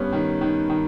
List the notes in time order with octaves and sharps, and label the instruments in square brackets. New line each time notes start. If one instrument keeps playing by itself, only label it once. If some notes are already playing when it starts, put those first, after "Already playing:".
Already playing: [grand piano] G2 B3 C#4
D#3
D#3
D#3